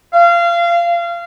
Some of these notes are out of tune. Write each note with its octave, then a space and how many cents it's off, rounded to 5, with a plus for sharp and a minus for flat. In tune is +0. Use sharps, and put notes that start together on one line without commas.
F5 -25